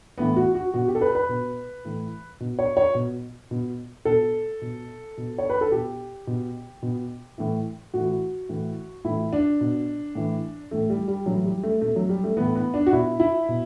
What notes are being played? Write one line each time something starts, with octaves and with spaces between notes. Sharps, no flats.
A2 E3 B3
F#4
F#4
B2 F#4
G4
A4
B4
B4
B2
A2 E3
B2
C#5
C#5
B2
B2
B2 A4
B2
B2
C#5
B4
A4
B2 G4
B2
B2
A2 E3
A2 E3 F#4
A2 E3
A2 E3 E4
D4
B2
A2 E3
A2 E3 A3
G3
G3
A2 E3 F#3
G3
A3
B2 A3
F#3
G3
A3
A2 E3 B3
B3
D4
F#4
B2 E4
E4
B2